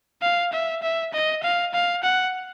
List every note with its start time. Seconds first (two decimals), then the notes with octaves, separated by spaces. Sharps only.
0.22 F5
0.53 E5
0.82 E5
1.13 D#5
1.43 F5
1.74 F5
2.03 F#5